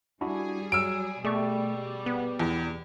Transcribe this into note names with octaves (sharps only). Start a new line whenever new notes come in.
G3 D4 E4 F#4 G#4
F#3 E6 D7
B2 G3 A3 G#4 D5 C#6
B3
E2